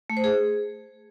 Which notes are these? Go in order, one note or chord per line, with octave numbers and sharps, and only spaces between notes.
A3
C5
G#4